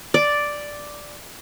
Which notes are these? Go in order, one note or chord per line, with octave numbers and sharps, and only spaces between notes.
D5